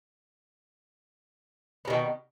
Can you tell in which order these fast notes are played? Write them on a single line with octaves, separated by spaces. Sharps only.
B3 B2 D#3